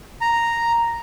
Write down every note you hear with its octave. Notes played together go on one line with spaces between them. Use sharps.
A#5